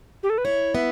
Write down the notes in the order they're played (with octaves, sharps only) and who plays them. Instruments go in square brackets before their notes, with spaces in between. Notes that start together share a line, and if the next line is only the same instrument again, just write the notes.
[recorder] G4
A4
B4
[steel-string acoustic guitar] E4 [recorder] C#5
[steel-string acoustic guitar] B3 [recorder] E5